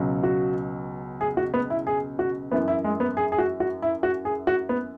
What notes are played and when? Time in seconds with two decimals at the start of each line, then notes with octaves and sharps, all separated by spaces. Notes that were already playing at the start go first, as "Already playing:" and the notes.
Already playing: C#2 B2 F#3
0.23 F#4
1.21 G#4
1.37 F#4
1.54 B3
1.70 E4
1.87 G#4
2.19 F#4
2.51 F#2 E3 B3
2.68 E4
2.84 G#3
3.00 B3
3.17 G#4
3.32 G#4
3.38 F#4
3.60 F#4
3.82 E4
4.03 F#4
4.25 G#4
4.47 F#4
4.69 B3